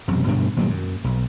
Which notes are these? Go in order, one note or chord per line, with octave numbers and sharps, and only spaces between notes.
E1 F#2 C3
G2 B2 D3 D4
G#1 A#2 F#3 G3
F#2
B1